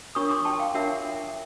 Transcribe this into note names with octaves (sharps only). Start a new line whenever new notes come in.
D4 F4 A#4 C#5 C#6 D#6
C6 D6
G5 A5
F5 G5
D4 F4 A#4 C#5 E5 F#5